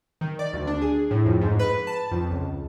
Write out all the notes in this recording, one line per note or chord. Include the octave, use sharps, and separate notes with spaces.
D#3
D5
D2
D4
G#4
A2
F2
G#2
B4
A5
F2
C#2